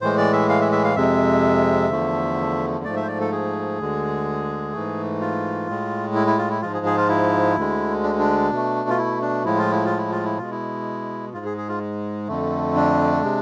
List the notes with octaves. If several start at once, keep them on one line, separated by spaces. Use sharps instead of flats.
A2 E3 G#3 C5
D5
E5
F5
E5
E5
F5
F2 C3 G#3 E5
E2 D3 F3 A3
G#2 F3 A3 D5
E5
C5
D5
A4
G#4
D2 D3 G#3
G#2 E3 A3
F4
A2 G#3
E4
E4
F4
E4
G#2 F3 G#3 F4
G#4
G#4
F4
E4
D2 D3 G#3
D4
D4
B2 A3
F4
E4
D4
A2 F3 G#3 E4
F4
E4
F4
E4
F4
E4
B2 G#3 F4
E4
G#2 G#3 F4
G#4
G#4
F4
F2 D3 A3
D4
C3 G#3